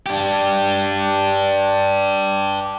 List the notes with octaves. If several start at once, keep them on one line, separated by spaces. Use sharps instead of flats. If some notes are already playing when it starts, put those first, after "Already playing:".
D4 G4